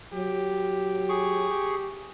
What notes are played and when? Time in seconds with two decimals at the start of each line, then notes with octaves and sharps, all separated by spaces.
0.13 F#3 G4
1.09 G#4 C#6
1.50 G4